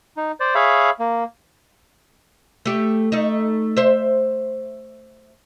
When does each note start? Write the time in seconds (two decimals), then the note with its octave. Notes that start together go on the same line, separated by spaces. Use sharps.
0.17 D#4
0.40 C5 D5
0.55 G#4 C#5 E5 F5 B5
1.00 A#3
2.65 A3 G4
3.12 A3 D#4
3.77 C5 E5